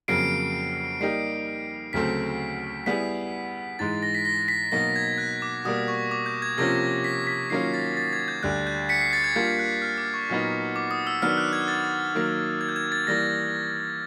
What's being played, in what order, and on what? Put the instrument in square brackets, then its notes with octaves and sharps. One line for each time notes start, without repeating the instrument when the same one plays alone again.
[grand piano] F2 C#3 F#3 A#3 [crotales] C7 D7
[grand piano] G3 A#3 D#4 G4 [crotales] C7
[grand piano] D2 C#3 F#3 A3 C4 [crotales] B6
[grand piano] G3 B3 E4 G#4 [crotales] B6
[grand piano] G#2 E3 G#3 [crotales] A6
[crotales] A#6
B6
A#6
B6
[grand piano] B2 F#3 A#3 D#4 [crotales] A#6
[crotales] G#6
F#6
D6
[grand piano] B2 G3 A#3 [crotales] D#6
[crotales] C#6
D6
G6
G#6
[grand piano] C3 F3 A#3 C#4 F4 [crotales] A#6
[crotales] B6
B6
[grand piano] D#3 F#3 A#3 C#4 F4 [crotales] C7
[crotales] A6
A6
G#6
G6
[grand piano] D2 D3 G3 [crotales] F#6
[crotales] G6
B6 C#7
C7
A6
G#6
[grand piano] G3 A#3 D4 F4 [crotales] G6
[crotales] F#6
F6
D6
C#6
[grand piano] A#2 F#3 B3 D#4
[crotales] D6
D#6
E6
[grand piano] D#3 F#3 B3 D4 [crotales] F6
[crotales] F#6
G#6
A6
[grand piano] D#3 F#3 A#3
[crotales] G#6
G6
G#6
A6
[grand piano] E3 G3 A#3 [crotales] A#6